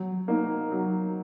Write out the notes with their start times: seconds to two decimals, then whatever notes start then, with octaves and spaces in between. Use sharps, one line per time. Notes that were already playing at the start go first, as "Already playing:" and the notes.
Already playing: F#3
0.28 A#3 D#4
0.71 F#3